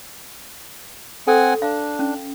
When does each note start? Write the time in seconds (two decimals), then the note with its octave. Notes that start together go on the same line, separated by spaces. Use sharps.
1.27 C4 A4 F#5 G#5
1.62 D4 F5
1.99 C#4